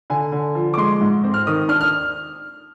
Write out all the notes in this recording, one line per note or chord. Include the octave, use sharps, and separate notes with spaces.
D3 G#5
D3
F3
D6
G#3 C6
G#2
C4
F6
D#3 D#6
D4 F6
F6